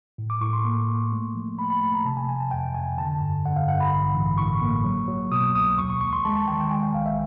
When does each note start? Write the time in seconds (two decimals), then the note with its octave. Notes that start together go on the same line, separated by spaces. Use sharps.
0.18 A2
0.30 D6
0.41 A2 C#6
0.53 C6
0.65 A#3
0.88 A#3
1.13 A3
1.35 F3
1.58 A3 B5
1.70 B5
1.81 A3 B5
1.94 A#5
2.05 C3 A5
2.17 G#5
2.29 F3 G#5
2.40 A5
2.51 F2 G5
2.75 F2 G#5
2.98 D3 A5
3.21 G2
3.45 D3 F#5
3.56 F5
3.68 G2 F#5
3.81 B5
3.92 A1
4.14 A1
4.38 A2 C#6
4.62 A#3
4.84 F#3
5.08 F#3
5.31 B2 D#6
5.55 C2 D#6
5.78 D#2 C#6
5.90 C#6
6.01 D#2 C#6
6.13 C6
6.25 G#3 A5
6.36 A5
6.48 D#3 G5
6.60 G5
6.71 G#3 G#5
6.83 G5
6.95 A#1 F5
7.06 E5